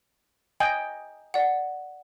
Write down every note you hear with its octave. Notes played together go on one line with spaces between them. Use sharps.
D#5 G5 G#5
D5 F#5